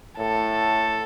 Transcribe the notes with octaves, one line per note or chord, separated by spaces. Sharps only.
A2 A4